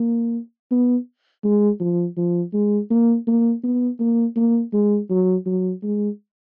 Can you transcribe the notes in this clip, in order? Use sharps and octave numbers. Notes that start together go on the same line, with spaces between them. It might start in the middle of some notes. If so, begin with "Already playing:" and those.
Already playing: A#3
B3
G#3
F3
F3
G#3
A#3
A#3
B3
A#3
A#3
G#3
F#3
F#3
G#3